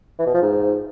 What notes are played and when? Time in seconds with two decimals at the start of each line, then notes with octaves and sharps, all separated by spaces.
0.19 E3
0.26 B2
0.34 F3
0.42 G#2